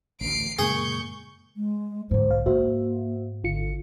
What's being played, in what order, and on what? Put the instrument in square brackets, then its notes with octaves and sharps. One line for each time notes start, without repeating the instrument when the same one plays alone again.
[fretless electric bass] A1 D2 [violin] C7 D7
[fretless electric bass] F#2 A#3 [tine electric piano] A#2 C#3 G#3 [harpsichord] G#4 [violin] C#6 G6
[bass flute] G#3
[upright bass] G#2 D3 [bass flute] C5
[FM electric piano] B1 F5
[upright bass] G#2 [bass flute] A#3 [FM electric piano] F#4 C5 E5
[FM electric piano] G#1 F4 C#7 [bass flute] D3